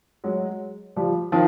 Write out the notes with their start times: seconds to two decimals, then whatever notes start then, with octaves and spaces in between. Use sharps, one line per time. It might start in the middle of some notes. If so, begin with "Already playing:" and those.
0.24 F#3 G#3
0.96 F3 G3
1.32 D#3 F3